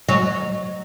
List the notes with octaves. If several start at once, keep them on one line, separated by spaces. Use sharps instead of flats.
F#3